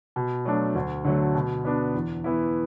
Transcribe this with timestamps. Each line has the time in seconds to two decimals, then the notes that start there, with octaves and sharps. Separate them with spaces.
0.16 B2
0.45 F#3 A3 D4
0.75 D2
1.04 D3 F#3 A3
1.35 B2
1.65 B3 D4
1.94 E2
2.24 E3 B3 E4